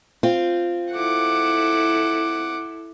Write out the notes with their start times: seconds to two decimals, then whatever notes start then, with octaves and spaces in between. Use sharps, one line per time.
0.23 C4 F4
0.91 E4 A4 F#5 D6